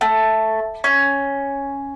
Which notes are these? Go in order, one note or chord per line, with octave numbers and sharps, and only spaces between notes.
A3
C#4